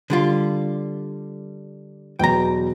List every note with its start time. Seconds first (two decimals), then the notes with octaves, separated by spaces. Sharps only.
0.10 D3 G3 F4
2.19 E2 B2 F#3 G5 A#5